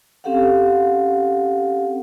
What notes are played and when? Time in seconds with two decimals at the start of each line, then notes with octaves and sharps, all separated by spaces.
0.24 C4 C#4 G4 A4 F5 F#5